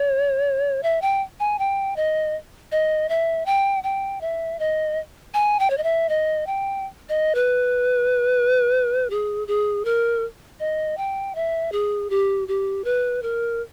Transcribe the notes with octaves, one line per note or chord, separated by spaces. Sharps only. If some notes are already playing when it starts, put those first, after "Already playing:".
Already playing: C#5
E5
G5
G#5
G5
D#5
D#5
E5
G5
G5
E5
D#5
G#5
G5
C#5
D#5
E5
D#5
G5
D#5
B4
G#4
G#4
A#4
D#5
G5
E5
G#4
G4
G4
B4
A#4